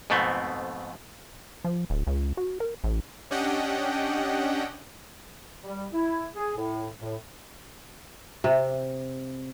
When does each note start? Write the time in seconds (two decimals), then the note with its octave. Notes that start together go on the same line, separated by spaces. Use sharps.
0.10 F2 G#2 B2 A3 B3 C4
1.64 F3
1.90 D1
2.07 C#2
2.37 F#4
2.60 A#4
2.84 A1
3.31 C#4 D4 G4 D#5 F#5 G5
5.64 G3
5.93 E4
6.35 G#4
6.56 A2
7.01 A2
8.44 C3